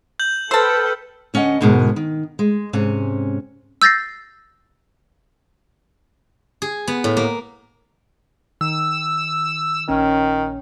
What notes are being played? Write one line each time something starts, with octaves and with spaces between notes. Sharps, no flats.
G6 F#7
A4 B4 C5 G5 A5 E6 F6
D2 C#4 D#5 F#5
D2 G#2 B2 G#3 A#4
D#3
G#3
G#2 C3 C#4
E6 G6 A6 A#6 C7
G#4
B3
A2
A#3
D#3 E6
A#1 D#3 C#4